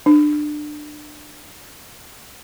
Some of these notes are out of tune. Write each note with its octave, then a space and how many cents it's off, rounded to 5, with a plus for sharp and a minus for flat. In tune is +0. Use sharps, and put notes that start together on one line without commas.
D4 +25